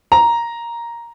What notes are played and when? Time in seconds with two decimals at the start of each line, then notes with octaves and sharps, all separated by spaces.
0.12 A#5